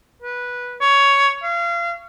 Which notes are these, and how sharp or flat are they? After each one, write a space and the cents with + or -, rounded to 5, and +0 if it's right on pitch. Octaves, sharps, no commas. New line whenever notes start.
B4 -10
C#5 +10
F5 -30